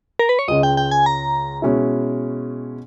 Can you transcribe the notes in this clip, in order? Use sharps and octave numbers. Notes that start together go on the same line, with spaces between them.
A#4
B4
C#5
C#2 C#3 G#3 C#4 D#5
G5
G5
G#5
A#5
B2 G#3 C#4 E4